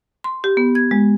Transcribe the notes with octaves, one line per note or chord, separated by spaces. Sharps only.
C6
G4
B3
G#6
G#3